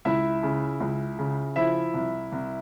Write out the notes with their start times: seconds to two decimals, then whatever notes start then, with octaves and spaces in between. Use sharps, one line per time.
0.05 C#2 E4 E5
0.43 C#3
0.80 C#2
1.19 C#3
1.56 F3 E4 E5
1.94 C2
2.32 C2